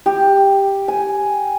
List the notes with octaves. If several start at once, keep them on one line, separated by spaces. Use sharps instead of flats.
G4
G#5